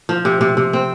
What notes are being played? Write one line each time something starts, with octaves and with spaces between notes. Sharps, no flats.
F3
C3
C3
C3
C4